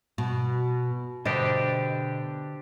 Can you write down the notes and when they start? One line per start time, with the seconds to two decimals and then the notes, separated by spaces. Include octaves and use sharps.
0.18 B2
1.25 B2 D3 D4 G4 C5 D#5